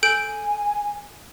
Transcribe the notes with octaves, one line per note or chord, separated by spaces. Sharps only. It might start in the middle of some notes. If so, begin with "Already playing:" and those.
A4 G#5 G6 D7